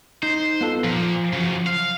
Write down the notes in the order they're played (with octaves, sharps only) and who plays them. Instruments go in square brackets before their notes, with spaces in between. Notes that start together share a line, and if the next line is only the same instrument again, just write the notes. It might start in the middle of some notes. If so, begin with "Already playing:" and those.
[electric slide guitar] D#4 [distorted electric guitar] C5
[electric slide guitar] B3 F4 A4
[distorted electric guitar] A#2 [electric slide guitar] F3
[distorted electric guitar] C#3 F#3
F5